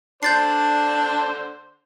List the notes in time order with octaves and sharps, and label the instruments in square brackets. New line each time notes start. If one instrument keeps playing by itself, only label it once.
[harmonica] D3 C5 D5 [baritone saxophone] D4 [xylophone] G6 A6 C7